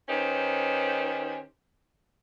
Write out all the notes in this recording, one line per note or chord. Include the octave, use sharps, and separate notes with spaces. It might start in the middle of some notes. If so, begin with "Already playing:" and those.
D#3 C#4 D#4 G4 B4 C5